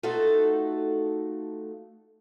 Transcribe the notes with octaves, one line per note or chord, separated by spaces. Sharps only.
A3 D#4 F4 F#4 A4